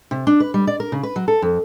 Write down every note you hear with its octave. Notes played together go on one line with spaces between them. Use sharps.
C3
D4
B4
G3
D5
A#4
C#3
B4
F#3
A4
F2